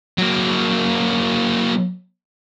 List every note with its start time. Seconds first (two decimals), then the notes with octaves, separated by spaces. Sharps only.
0.18 F#3 A#3